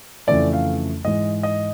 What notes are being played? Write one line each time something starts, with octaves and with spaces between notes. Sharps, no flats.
F2 C#3 E3 A3 D5
F5
G#2 E3 G#3 D#5
D#5